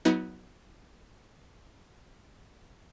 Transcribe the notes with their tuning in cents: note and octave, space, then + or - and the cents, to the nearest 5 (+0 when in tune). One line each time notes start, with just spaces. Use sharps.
F#3 +0 B3 +0 D#4 +45